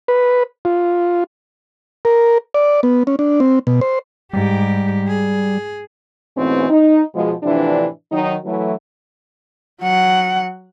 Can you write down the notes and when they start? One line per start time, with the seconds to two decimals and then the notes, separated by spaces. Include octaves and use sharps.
0.08 B4
0.65 F4
2.05 A#4
2.54 D5
2.83 B3
3.07 C#4
3.19 D4
3.40 C4
3.67 B2
3.81 C5
4.33 G#2 G3 G4
5.07 G#4
6.36 G#2 B2 E3 A3 C4 C#4
6.69 D#4
7.14 B2 F3 G#3
7.43 A2 C3 E3 F3 D4
8.11 D#3 F#3 D#4
8.44 E3 F#3 A3
9.82 F#3 F#5